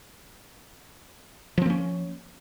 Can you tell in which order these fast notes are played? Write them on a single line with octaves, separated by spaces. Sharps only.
F3 C4 A#3 C#4